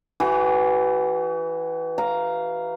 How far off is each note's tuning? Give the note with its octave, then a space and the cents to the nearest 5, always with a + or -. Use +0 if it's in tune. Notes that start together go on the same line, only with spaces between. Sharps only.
E3 +0 F#4 +45
F5 +0 A#5 +0